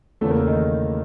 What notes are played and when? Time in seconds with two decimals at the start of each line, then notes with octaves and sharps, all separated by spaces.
0.21 E2 C#3 E3 A3 A4
0.30 A#3 A#4
0.38 A3 A4
0.47 D#3 D#4